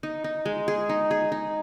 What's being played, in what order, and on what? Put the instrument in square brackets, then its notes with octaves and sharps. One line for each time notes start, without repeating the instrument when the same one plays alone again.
[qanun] D#4
D#4
G#3
G#4
D#4
G#4
D#4